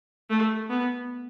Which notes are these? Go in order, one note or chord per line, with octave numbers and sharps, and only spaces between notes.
A3
B3